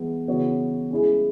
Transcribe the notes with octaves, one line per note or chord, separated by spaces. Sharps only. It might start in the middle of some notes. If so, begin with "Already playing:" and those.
Already playing: E3 G#3 B3
C#3 E3 B3 F#4 C#5
G#3 C#4 E4 G#4